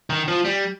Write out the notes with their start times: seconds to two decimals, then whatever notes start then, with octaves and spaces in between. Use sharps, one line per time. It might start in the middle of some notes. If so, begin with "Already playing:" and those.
0.10 D#3
0.28 F3
0.45 G3